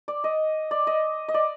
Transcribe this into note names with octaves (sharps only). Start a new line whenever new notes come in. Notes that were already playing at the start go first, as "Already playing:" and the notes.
D5
D#5
D5
D#5
D#5
D5